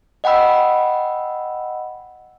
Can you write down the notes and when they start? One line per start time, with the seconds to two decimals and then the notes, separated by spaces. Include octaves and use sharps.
0.24 D#5 F#5 G5 B5 E6